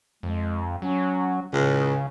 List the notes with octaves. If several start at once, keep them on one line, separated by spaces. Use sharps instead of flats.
F2 G#3
F#3 C#4
C#2 A2 C#3